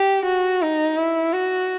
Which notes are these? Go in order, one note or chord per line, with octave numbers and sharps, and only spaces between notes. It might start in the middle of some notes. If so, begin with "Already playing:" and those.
Already playing: G4
F#4
D#4
E4
F#4